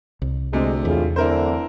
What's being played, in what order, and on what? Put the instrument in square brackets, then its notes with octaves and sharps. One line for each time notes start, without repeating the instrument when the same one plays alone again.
[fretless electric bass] C2
[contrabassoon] D2 [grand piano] C3 [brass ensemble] G#3 C4 G#4
[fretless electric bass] E2 [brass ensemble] A2 F4 G#4
[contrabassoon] D1 [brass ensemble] D3 E3 [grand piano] E4 A#4 C5